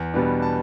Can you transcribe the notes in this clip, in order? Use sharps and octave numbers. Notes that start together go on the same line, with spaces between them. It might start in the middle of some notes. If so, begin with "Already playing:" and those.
Already playing: E2
B2 G3 B3 D4
A5